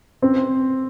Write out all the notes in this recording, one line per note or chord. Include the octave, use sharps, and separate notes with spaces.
C4